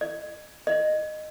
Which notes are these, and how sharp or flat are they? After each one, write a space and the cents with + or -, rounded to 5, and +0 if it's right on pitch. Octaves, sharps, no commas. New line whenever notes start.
D#5 -35
D#5 -15